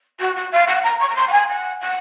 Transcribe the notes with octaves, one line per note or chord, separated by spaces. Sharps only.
F#4
F#4
F5
F#5
A#5
C#6
A#5
C6
F#5
G#5
F#5
F#5